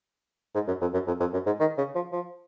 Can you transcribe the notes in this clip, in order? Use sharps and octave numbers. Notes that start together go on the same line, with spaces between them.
G#2
F#2
F2
F#2
F2
F2
F#2
G#2
D#3
C#3
F3
F3